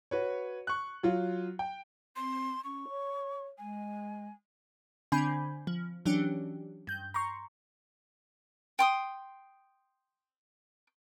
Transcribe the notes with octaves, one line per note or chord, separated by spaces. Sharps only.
F#4 B4 C#5
C#6 F#6
F#3 F4
G5
C4 C6
C#4 C#6
C#5
G#3 G#5
D3 C4 D4 G#5 B5 G6
F3
E3 F#3 C#4 D4 G4
G2 G6
A#5 C6 C#6
G5 C6 D#6